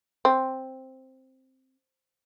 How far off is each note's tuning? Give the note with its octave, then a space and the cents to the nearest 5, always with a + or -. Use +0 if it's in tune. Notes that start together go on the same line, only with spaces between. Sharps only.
C4 +5